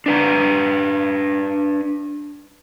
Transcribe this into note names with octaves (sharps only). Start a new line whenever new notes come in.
D4 B4 A#5